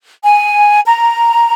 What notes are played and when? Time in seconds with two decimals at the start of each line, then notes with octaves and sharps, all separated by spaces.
0.23 G#5
0.85 A#5